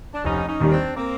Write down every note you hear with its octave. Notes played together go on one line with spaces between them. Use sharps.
D4
F1 C#4 D#4
C#4 D#4
D#2 D#3 G3
C4 D4
A#3 C4